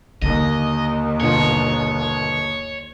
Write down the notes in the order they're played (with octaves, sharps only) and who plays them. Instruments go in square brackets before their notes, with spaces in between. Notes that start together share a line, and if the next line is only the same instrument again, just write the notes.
[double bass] D#2 D#3 [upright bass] D3 [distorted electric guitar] D#5
[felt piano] G1 B2 F4 [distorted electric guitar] C#5